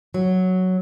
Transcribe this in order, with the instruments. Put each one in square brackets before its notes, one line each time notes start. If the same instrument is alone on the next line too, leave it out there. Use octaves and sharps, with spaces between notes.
[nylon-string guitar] F#3